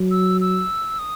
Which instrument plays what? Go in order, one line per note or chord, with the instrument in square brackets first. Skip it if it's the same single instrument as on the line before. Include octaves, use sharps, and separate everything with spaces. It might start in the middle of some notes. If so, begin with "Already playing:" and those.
Already playing: [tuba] F#3
[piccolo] E6
E6
D#6